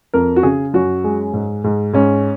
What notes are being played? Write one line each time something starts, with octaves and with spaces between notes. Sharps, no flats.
F2 A#4
F#4
C#3 G#4
F#2 F#4
G#3
G#2
G#2
G#2 C#4